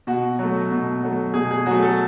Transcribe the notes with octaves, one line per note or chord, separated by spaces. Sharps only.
B2 F#4
F#3 A3
B2
F#3 A3
B2 G#4
G#4
F#3 A3 F#4
A4